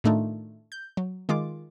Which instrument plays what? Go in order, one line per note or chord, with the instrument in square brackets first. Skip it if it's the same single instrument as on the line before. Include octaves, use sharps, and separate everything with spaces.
[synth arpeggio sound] A2 D#3 A3 D4 D#4 F4
G6
F#3
D#3 G#3 F4 D6